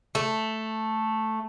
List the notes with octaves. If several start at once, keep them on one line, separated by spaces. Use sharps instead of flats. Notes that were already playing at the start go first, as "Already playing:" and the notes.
A3